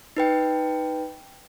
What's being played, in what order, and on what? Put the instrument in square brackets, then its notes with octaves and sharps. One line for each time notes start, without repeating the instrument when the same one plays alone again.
[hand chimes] D#4 B4 G5